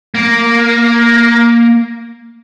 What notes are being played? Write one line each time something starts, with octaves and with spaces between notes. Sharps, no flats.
A#3